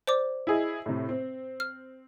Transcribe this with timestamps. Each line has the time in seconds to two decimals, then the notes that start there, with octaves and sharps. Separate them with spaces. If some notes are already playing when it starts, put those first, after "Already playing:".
0.07 C5 D5 D6
0.47 E4 G#4 D#5
0.86 A2 C3
1.09 C4
1.60 F6